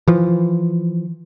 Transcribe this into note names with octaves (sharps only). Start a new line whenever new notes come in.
E3 F3